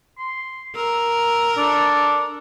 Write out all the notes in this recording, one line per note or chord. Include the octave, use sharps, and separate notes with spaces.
C6
A#4 E6
D4 A4